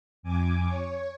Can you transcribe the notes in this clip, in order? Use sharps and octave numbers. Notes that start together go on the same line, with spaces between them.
F2 G#5 D6
C#5